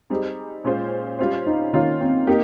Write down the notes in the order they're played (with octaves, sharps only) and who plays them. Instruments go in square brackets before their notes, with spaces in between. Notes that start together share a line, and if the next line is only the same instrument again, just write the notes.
[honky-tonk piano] G3 C4 D#4 G#4
A#2 G#3 C#4 F4 C5
G3 C#4 F4 C5
[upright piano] D#4
[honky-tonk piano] D#3 A#3 F4 [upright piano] C#4
[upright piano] C4
[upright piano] A#3 [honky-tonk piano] D#4 G4